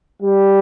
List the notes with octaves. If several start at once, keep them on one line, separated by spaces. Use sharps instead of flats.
G3